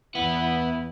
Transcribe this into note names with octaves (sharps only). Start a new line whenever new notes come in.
E2 B3 E4 B4 F#5